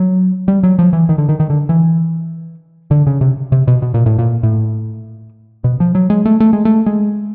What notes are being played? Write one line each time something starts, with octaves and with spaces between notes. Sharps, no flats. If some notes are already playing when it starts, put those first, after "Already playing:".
Already playing: F#3
G3
F#3
F3
E3
D#3
D3
D#3
D#3
D3
E3
D3
C#3
C3
C3
B2
B2
A#2
A2
A#2
A2
B2
F3
F#3
G#3
A3
A3
G#3
A3
G#3